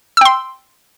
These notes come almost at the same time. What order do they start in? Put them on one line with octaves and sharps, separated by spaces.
E6 G5 C6